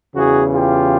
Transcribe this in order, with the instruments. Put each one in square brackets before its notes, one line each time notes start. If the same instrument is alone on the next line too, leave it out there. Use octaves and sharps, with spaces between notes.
[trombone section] E2 C#3 E3 G3 F#4 G#4
F4 G4